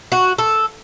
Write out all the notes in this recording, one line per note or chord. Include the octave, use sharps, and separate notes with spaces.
F#4
A4